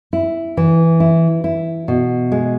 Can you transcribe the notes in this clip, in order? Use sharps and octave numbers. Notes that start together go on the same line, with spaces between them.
E4
E3
E4
E4
B2
G#3